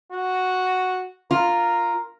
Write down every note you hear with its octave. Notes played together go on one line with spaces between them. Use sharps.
F#4
F4 A#4